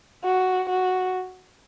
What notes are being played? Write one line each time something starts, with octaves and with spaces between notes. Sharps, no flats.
F#4
F#4